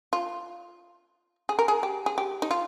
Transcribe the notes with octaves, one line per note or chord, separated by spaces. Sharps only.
F4
G#4
A#4
G#4
G4
G#4
G4
D#4
F4